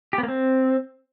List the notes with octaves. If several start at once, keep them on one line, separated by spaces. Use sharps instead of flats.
G4
B3
A#3
C4